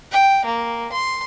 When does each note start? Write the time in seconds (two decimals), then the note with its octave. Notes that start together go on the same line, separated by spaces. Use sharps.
0.11 G5
0.45 A#3
0.92 C6